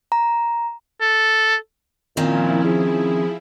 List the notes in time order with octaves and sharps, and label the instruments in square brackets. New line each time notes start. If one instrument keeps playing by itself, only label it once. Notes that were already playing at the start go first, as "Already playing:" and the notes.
[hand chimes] A#5
[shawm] A4
[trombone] A#2 [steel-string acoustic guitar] D#3 C4 C#4 [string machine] F3 E4
[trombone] G#4